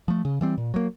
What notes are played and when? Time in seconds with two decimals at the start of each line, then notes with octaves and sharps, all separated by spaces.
0.08 F3 A3
0.25 C#3
0.41 E3 G3 C4
0.58 A#2
0.74 F#3 A#3